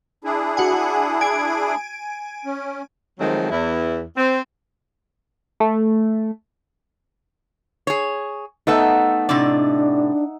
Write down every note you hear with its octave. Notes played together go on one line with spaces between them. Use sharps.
D4 E4 G#4
F#4 F#5 G#5
G#5 G#6 D7
C#4
D#3 F3 F#3 G#3 A3 C4
E2 E4
C4
A3
G#4 C#5
A3 B3 D#4 A4 E5 F#5
A2 C3 D4 D5